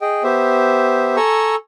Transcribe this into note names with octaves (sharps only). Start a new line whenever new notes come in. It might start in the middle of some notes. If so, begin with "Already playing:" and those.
G#4 D#5 G5
B3 G4 C5 E5
A4 G#5 A#5 C#6 E6